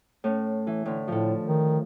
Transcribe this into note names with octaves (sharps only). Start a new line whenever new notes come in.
A2 C#4
E3
A2 D3
A2 F3 A4
D#3